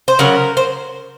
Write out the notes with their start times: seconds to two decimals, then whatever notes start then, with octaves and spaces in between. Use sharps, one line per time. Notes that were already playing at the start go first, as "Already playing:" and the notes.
0.08 C5
0.19 C#3 F#3 A#4
0.57 C5